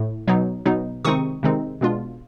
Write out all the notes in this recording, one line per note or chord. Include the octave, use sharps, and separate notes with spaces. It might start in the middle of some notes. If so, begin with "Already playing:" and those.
Already playing: A2 A3
B2 F#3 B3 D#4
B2 F#3 B3 D#4
C3 D#3 G#3 C4 D#4 C#6 D#6
C3 D#3 G#3 C4 D#4
B2 G#3 B3 D4 F4